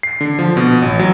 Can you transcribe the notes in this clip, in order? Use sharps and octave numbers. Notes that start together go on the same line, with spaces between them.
C7
D3
F3
B2
A1
F#3